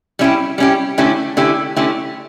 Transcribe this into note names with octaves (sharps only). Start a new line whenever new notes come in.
G3 C#4 E4 G4
G3 C#4 E4 G4
D3 A3 C#4 E4 G4
D3 A3 C#4 E4 G4
D3 A3 C#4 E4 G4